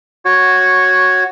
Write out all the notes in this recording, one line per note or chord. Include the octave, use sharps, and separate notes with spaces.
F#4 C#5